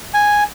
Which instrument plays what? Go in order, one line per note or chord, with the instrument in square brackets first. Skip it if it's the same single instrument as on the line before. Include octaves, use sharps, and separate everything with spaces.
[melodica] G#5